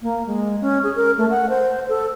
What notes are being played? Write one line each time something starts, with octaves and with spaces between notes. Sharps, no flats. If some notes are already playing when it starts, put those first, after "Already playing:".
A#3
G#3
C#4
G#4
A#4
A3
F#5
C5
A4